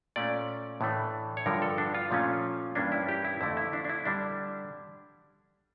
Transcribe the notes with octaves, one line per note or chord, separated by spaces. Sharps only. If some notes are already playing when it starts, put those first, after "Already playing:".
A#2 A3 C#4 D5
A2 E3 A3 D4
C#5
G2 D3 F3 A#4
A4
D4
F4
A#2 F3 A3 C#4
G2 E3 A#3 C#4 D4
E4
G4
E4
F2 D3 A3 E4
E4
D4
D4
E4
D3 G3 D4